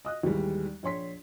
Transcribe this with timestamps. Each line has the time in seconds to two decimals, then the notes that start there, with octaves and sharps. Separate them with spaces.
0.05 D#5 D#6 F#6
0.23 D#2 A2 E3 G3 G#3
0.83 A#1 C#5 C6 B6